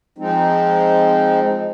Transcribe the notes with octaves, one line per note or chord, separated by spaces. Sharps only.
F3 G#3 C4 D#4